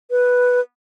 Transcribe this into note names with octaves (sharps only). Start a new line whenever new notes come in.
B4